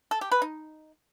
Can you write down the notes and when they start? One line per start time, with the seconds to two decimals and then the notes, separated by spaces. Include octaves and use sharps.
0.11 A4
0.21 G4
0.32 B4
0.42 D#4